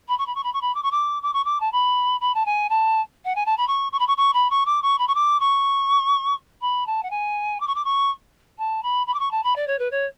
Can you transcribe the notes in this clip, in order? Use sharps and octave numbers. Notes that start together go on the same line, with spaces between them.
B5
C#6
B5
C#6
B5
C#6
B5
D6
C#6
D6
D6
C#6
D6
A5
B5
B5
A5
G#5
A5
F#5
G#5
A5
B5
C#6
C#6
B5
C#6
C#6
B5
C#6
D6
C#6
B5
C#6
D6
C#6
B5
A5
F#5
G#5
D6
C#6
D6
C#6
A5
B5
B5
D6
C#6
A5
B5
D5
C#5
B4
C#5